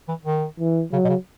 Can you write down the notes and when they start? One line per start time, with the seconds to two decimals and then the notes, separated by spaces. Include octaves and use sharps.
0.09 E3
0.25 D#3
0.60 E3
0.92 C#3 F#3
1.05 B2
1.09 C#3